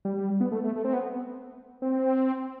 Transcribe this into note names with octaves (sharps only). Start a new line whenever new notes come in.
G3
B3
A3
A3
A3
C4
B3
C4